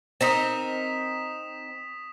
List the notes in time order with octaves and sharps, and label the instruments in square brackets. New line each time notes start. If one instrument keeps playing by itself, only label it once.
[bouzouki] C4 D#4 A#4 [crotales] D#6 B6 E7